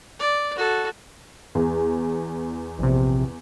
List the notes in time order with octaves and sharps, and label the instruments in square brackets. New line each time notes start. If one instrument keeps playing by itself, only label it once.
[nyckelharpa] D5
F#4 A4
[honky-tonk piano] E2
[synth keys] A#1 C3